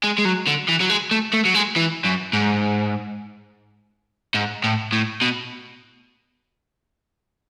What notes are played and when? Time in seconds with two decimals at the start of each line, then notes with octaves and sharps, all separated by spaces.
0.04 G#3
0.18 G#3
0.25 F#3
0.47 D3
0.68 E3
0.80 F#3
0.90 G#3
1.11 A3
1.33 A3
1.45 F#3
1.54 G#3
1.76 E3
2.05 F#2
2.33 G#2
4.34 G#2
4.64 A2
4.93 A2
5.21 B2